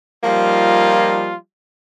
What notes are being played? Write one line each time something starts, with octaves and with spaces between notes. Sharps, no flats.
F3 G3 A#3 D#4 F4